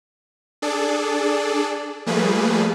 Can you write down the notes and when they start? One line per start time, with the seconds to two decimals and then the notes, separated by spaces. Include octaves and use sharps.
0.62 D4 G#4 A4 D5
2.06 F3 G3 A3 A#3 G#4 B4